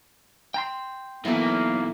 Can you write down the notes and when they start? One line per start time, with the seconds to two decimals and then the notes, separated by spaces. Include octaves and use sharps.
0.54 G5 A#5 C6
1.25 B1 B2 E3 A3 A#3